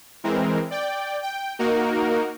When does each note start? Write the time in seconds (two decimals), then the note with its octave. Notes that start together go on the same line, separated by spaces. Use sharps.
0.24 E3 G#3 C4 A#4
0.71 D5 G5
1.22 G5
1.59 A#3 D#4 F#4 A#4